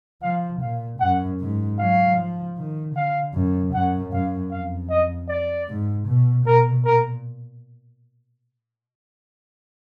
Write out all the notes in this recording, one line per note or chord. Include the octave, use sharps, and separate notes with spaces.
F3 F5
A#2 F5
F#2 F#5
G#2
F#3 F5
F3
D#3
D3 F5
F#2
F#2 F#5
F#2 F5
F2 F5
D#5
D5
G#2
B2
B2 A#4
A#2 A#4